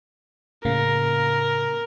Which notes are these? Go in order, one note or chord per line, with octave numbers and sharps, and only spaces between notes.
A2 C#3 A#3 A#4